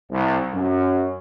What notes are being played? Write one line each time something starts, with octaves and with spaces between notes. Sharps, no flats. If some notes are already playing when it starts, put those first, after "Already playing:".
C2
F#2